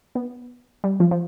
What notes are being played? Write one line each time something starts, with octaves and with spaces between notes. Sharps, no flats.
B3
G3
F3
F3